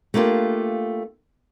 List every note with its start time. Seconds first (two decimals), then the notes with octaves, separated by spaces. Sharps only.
0.14 A3 A#3 D4 F4 G4